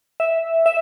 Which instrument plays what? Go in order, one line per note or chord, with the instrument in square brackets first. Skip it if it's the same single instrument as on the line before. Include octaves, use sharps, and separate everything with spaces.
[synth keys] E5
E5